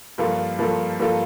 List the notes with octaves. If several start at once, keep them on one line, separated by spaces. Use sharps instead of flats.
G2 F3 A#3 F4 A4
G2 F3 A#3 F4 A4
G2 F3 A#3 F4 A4